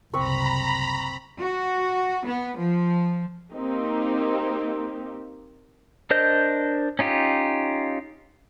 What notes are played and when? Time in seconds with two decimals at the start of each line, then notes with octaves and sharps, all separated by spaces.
0.14 F#1 C2 C4 B4 A#5 B5 C#6
1.41 F#4
2.26 B3
2.58 F3
3.53 A#3 C4 D#4 G4
6.10 D4 A#4 C5 D#5 G6
6.99 C#4 D#4 F4 G4